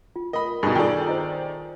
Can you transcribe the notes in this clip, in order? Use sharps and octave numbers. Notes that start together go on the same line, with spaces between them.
F4
A#4 D#5 B5
G2 B2 D#4 G#4
D#3 F4 G#4 A4 D5 G5
C5 D#5 A#5